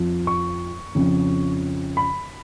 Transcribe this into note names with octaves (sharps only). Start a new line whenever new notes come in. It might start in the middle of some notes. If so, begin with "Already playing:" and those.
Already playing: F2 F3
C#6
F2 C#3 F3
B5